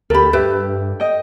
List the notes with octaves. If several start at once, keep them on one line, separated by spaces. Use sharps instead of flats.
D2 G4 A4 A#4 B5
G2 G4 B4 E5
D#5 G5